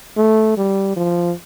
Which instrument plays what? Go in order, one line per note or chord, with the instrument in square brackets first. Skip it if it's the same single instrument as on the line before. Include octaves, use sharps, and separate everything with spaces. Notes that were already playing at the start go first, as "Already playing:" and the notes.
[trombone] A3
G3
F3